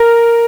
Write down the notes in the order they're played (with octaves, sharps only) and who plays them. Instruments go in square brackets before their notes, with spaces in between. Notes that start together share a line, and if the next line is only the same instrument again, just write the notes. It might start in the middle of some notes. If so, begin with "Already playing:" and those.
Already playing: [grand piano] A#4